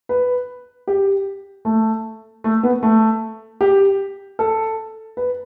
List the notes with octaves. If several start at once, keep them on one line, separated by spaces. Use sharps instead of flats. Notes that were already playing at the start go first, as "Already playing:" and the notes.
B4
G4
A3
A3
B3
A3
G4
A4
B4